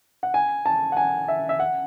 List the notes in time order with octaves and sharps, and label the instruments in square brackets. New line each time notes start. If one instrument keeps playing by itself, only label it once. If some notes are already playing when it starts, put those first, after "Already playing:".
[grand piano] F#5
G#5
A5
F#5
G#5
E5
E5
F#5